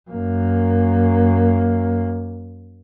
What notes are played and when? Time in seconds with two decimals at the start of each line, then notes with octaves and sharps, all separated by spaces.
0.11 F#2 A#3